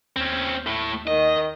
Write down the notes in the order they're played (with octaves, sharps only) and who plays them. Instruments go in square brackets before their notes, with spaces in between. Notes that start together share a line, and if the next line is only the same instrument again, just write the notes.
[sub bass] D#2 [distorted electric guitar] C4 C#4
[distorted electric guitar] A2 A3
[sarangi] D#3 [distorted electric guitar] D#5